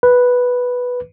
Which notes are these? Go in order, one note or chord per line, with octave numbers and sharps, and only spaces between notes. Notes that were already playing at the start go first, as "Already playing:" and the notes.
B4